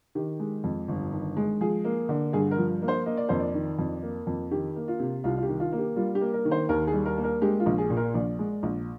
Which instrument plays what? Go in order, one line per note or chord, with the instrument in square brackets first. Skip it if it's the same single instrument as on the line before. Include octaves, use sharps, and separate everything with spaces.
[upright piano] D#3 G4
G#3
F2
G1
D#3
G#3
F3 G#4
A#3
D3
G2 G#4
A#4
F3
A#3
C5
A#3 D#5
D5
F2 C5
D5
D#3
F2
A#3
F2
D#3 G4
A#3
F4
C3
C2 F4
F4
G4
D#3
F4
A#3
G4
G3 F4
G4
A#3
A#4
D#3
C5
D#2 A#4
G#4
G3
A#4
A#3
A#4
G#3 G4
F4
A#1
G#4
A#2
A#4
A#1 D5
G#3
A#1